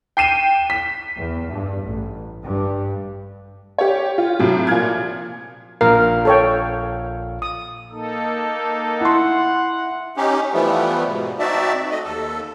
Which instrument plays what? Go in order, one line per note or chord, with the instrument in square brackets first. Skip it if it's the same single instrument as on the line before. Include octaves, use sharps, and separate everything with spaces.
[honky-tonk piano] G5 C7 D#7 E7
B6
[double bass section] E2
G2
A1
G2
[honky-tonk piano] G4 C#5
F4
A2 C3 F#3
A#2 F3 F6 G#6
[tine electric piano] A#1 A#2 F5 [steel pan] A#4
[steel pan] A4 C#5 G5
D#6
[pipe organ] A#3 D#4 A4
[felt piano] E4 C6 [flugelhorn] F#5
[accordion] C#4 D#4 G4
E3 F3 G3 A3 B3
G#2 B2
C4 D#4 F#4 D5 E5 A5
A3 D#5
D#2 A4